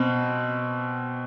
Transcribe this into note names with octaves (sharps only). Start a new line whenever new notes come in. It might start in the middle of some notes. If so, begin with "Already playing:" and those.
Already playing: B2 C4